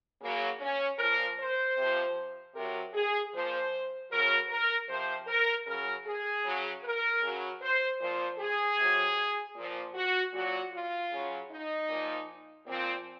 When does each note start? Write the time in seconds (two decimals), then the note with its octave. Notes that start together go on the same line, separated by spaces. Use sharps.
0.22 C#3 F#3 A#3
0.60 C#4
0.99 A#2 F3 A#4
1.38 C5
1.77 C3 F3
2.54 C3 F#3 A#4
2.94 G#4
3.33 A#2 F3 C5
4.11 C#3 F#3 A#4
4.49 A#4
4.88 C3 F3 C5
5.27 A#4
5.66 C#3 F#3 A#4
6.05 G#4
6.44 C#3 F#3
6.84 A#4
7.22 C#3 F#3
7.61 C5
8.00 A#2 F3 C5
8.38 G#4
8.77 C3 F#3
9.55 A#2 F3
9.94 F#4
10.33 A#2 F#3 F#4
10.72 F4
11.11 C#3 F#3
11.49 D#4
11.89 A#2 F3
12.67 A#2 F3 C4